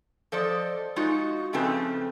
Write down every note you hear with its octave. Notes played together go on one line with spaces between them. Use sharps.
F3 A4 C5 D5 D#5
G#3 D#4 F4 F#4
F2 C#3 A3 C4 B4 A5